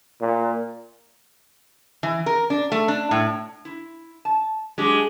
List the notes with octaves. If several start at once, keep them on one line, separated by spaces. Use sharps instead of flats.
A#2
E3
A#4
D4
A3
D4
A2
E4
A5
F#3 G#3 D4 G4